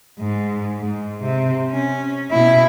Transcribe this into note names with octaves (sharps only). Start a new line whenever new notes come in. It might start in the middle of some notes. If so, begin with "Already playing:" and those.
G#2
G#2
C3
C#4
B2 E4